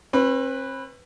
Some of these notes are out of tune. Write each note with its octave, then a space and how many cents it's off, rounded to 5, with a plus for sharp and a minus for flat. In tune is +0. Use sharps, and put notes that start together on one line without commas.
C4 +40 B4 +0